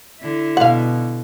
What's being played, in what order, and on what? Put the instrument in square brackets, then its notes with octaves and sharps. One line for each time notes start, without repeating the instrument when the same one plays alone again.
[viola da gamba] D3 E4
[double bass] B2 [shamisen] F5 F#5